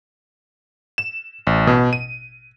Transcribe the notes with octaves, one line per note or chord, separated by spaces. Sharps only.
E7
A1
B2
D#7